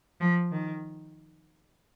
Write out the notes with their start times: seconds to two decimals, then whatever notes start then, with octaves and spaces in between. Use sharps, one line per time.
0.20 F3
0.51 D#3